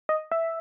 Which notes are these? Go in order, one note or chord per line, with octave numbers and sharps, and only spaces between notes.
D#5
E5